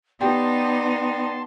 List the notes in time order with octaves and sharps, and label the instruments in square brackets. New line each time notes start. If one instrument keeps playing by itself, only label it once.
[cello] B3 D#4 [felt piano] G4 [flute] D5 [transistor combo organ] A5 C6